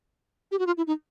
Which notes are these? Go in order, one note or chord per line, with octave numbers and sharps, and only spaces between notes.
G4
F#4
F4
E4
D#4